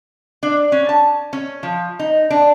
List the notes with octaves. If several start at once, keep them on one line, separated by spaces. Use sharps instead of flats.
D4
C#4
A5
C#4
F3
D#4
D4